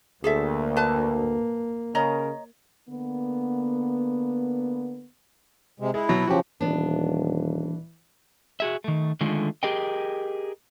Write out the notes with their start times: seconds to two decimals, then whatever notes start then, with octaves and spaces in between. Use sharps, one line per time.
0.24 D2 A#3 G#4 A4 E5
0.76 B4 A5
1.95 C#3 A#4 C#5 D#5 A#5
2.89 D3 A#3 B3
5.80 C3 G#3
5.94 G#3 E4
6.09 B2 F#3
6.27 C#3 F3 F#4 G4
6.61 D#1 E3 B3 D4
8.60 F#4 G#4 E5
8.84 D#3 A3
9.21 D3 D#3 G#3 A3 F4
9.63 G4 G#4 A#4 D#5 G5